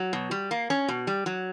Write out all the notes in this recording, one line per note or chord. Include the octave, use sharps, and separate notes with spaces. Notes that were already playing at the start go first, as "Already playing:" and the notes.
Already playing: F#3
B2
G3
A#3
C#4
B2
G3
F#3